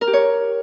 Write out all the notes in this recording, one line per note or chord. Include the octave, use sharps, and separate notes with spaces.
A#4
G4
C#5